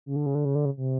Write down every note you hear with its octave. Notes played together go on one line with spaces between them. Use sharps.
C#3
D3
C#3
D3
C#3
D3
C#3
C3